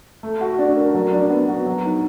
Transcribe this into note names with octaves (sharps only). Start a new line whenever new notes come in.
A3
F#4
D4
A#4
F#3
D4
B3
F#4
F#3
D#4